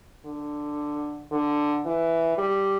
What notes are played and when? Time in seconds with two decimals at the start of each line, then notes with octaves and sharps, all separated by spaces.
0.26 D3
1.32 D3
1.85 E3
2.38 G3